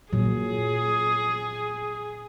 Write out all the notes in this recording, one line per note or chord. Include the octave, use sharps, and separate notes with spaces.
A#2 F#3 G#4